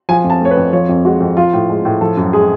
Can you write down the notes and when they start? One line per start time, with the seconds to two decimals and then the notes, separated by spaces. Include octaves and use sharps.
0.09 F3 G#5
0.24 F2
0.30 A5
0.41 A3 C#5
0.51 B4
0.57 F2
0.73 F3 C#5
0.89 F2
1.05 G#3 F#4
1.20 F2
1.37 F3 F4
1.53 A2
1.70 G#3
1.85 A2
2.01 F3 A4
2.17 F#2
2.33 G#3 G#4